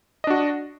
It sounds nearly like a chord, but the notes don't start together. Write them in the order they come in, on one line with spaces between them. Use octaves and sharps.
D#5 D4 F#4